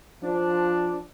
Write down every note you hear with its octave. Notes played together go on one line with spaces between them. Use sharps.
F3 D4